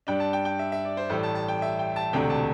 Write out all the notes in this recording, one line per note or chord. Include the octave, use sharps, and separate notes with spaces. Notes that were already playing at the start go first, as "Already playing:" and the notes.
G2 G3 D4 G5
A5
G5
G5
E5
E5
D5
C5
A1 A2 G3 A4
A5
A5
G5
E5
G5
A5
E1 D2 C3 A3 D4 G5
A5